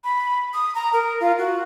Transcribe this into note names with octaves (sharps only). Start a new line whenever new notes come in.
B5
D#6
A#5
A#4
F4
F#4